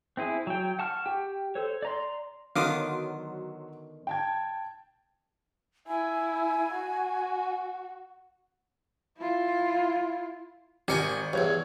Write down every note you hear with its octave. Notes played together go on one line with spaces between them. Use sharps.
C4 E4 G#4
F#3 G5
F#5 A5 C#6 F6
G4 G5
A4 C5 C#5
D5 A#5 C6
D3 D#3 F#3 B3 F5 C6 D6 D#6
G5 A5 G#6
E4 G#5
F#4
E4 F4
G#1 G4 A#4 D#5 G#5 C#7
E2 G2 C#5 G#6